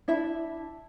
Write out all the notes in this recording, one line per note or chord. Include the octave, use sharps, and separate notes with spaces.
D4 E4 E5 B5